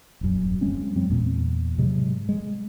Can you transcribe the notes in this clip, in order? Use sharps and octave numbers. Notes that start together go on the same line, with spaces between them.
D#1 F#2
G#3 C4 C#4
F#2 F#3 C4
E2 A#2
G#2 C3 F#3 G#3
G#3